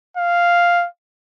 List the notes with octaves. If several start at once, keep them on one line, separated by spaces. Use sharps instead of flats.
F5